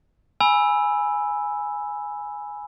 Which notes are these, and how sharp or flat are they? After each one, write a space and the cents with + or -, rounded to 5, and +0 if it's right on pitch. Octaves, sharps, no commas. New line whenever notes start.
G#5 +0 B5 -10 E6 +0